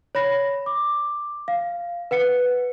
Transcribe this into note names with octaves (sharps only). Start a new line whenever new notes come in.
C#5 B5 A#6
D6
F5
B4 F#5 C#7